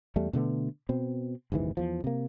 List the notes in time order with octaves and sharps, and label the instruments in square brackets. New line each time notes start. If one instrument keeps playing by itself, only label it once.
[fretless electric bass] E2 G3 A3
B2 D3 A3 B3
B2 C4
F#1 D#2 G#2 E3
E2 F3
C3 A#3